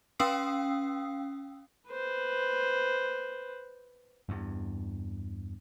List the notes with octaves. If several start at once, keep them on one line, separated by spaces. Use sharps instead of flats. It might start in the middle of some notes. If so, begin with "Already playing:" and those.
C#4 F5 G5 D#6 E6 C7
B4 C5
E2 G2